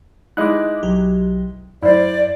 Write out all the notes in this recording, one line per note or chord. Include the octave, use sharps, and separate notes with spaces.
G#3 D#4 E4 D6 F#6
B1 F#3 G4
F#2 E4 C5 D5